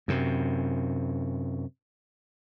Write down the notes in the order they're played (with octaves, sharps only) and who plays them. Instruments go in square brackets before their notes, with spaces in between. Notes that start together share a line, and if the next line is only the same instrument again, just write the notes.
[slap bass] F#2 C3